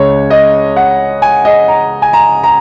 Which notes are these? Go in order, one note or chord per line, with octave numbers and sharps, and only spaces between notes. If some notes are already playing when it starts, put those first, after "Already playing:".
Already playing: C#2 C#3 G#3 C#5
D#5
F#5
G#5
D#5
A#5
G#5
A#5
A#5